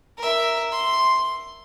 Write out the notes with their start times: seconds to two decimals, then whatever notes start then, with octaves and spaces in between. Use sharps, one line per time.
0.18 A#4 E5
0.72 C6